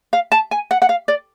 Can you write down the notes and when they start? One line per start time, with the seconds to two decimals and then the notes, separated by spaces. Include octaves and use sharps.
0.13 F5
0.32 A5
0.51 G#5
0.71 F#5
0.82 F#5
0.89 F5
1.08 D5